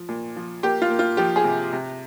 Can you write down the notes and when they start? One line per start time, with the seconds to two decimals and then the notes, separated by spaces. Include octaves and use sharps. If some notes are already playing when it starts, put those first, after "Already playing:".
Already playing: F3
0.09 A#2
0.36 F3
0.63 A#3 G4
0.82 F4
0.90 A#3
0.99 F4
1.17 F3 G4
1.36 G#4
1.44 C3
1.73 C3